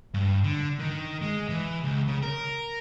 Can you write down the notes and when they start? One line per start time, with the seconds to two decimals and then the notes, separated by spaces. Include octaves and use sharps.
0.14 G2
0.44 D3
0.79 D#3
1.22 G#3
1.49 E3
1.83 C#2
2.08 C#3
2.22 A#4